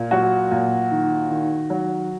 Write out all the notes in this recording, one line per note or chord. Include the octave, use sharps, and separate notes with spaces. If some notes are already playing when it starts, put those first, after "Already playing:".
Already playing: A#2
F#3 F#4
A#2
D#3
D#3
F#3